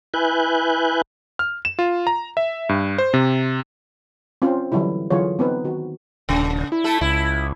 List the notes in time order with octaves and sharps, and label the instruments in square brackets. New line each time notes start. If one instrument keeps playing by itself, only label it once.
[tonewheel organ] E4 B4 G#5 F#6 G6
[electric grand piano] F6
E7
F4
A#5
E5
G2
C5
C3
[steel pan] C4 C#4 F4 C5
D3 E3 F#3 G3 E4
D3 E3 F#3 F4 G#4 C#5
B3 C4 D#4 B4
D#3 F#4
[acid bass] D#1 [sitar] C#3
[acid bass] E4
[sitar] A3 A4
[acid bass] C#2 [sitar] E4